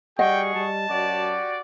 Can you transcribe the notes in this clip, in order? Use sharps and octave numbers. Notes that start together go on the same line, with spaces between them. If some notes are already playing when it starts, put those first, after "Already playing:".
G3 F#4 G#4 D#5 F#5 G5 C#6
G3 A5
F#2 F#4 G4 D5